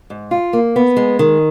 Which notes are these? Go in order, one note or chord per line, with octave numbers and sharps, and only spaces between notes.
G#2
F4
A#3
B3
G#3
D#3